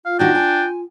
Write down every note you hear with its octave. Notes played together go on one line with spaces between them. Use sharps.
F4 F5
E2 D#3 D4 F#4 G5
G#5